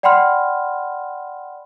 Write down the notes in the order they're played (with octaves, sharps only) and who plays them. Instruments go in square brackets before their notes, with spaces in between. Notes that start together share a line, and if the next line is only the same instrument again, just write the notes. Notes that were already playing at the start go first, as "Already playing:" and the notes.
[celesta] D5 F#5 G5 B5 C6 F6